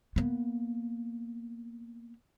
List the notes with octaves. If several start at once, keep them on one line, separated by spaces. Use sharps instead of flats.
A#3 B3